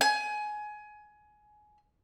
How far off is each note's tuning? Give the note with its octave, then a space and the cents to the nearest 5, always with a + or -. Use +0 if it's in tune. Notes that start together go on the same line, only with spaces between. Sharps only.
G#5 +20